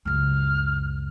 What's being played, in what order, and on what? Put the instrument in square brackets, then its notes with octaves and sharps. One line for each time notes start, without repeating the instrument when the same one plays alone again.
[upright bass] C#2 F#2 [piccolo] F6